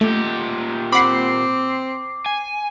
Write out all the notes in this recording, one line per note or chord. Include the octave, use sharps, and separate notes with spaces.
A#2 A3 G4
C4 F#5 B5 D6 C7
G#5